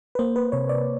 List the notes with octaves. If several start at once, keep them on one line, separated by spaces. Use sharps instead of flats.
B4
A#3 C5
B4
C3 C#5
D5